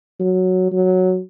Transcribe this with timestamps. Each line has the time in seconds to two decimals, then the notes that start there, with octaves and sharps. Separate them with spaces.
0.20 F#3
0.72 F#3